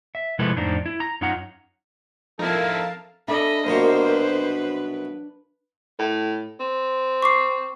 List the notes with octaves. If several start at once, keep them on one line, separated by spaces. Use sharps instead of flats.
E5
C3 F3 G#3 E4 A4 B4
F2 A2 D4 D#4 C5 A#5
E4
A#5
F#2 C#4 D#4 F4 F#5 A#5
F3 C4 D#4 E4 A4 A#4 F5 A5
D4 A4 D#5 E5 B5
C2 F#2 B2 A#3 C5
B4
A2
C4
C#6 D6 C7